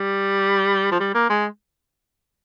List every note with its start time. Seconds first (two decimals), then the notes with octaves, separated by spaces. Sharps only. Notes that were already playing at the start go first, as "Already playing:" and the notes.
Already playing: G3
0.91 F3
1.00 G3
1.14 A#3
1.30 G#3